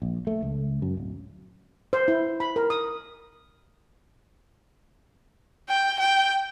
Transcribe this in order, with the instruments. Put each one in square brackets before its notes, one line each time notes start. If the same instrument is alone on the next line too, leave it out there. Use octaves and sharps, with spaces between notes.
[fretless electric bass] A#1
A3
C#2
F#2
D1
[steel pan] C5
E4
B5
A#4
D#6
[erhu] G5
G5